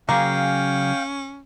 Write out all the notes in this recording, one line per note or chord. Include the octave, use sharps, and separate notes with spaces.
C#3 F#3 A#3 C#4 G#4 F5 G5